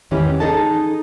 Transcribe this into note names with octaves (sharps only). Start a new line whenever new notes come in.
E2 G#2 D#3 E3 C#4 G4
D#4 G#4 A4 D#5 A5